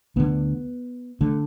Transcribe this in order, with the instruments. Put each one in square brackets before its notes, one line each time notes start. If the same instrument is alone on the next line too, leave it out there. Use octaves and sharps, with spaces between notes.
[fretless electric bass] D2 D3 B3
D3 A3